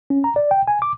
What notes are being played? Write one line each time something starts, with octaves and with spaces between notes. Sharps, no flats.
C#4
A#5
D5
G5
G#5
D6